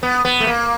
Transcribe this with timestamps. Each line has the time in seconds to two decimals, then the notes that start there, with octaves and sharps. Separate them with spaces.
0.03 B3
0.25 B3
0.40 A3
0.47 A#3